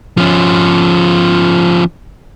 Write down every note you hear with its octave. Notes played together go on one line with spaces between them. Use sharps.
F3 C#4